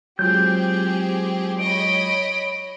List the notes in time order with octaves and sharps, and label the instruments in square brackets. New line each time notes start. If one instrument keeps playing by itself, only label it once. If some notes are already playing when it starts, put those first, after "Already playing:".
[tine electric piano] F#3 G#3 F4 [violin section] C4 G4 G#4 [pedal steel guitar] G6
[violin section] C#5 D#5 B5 [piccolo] D7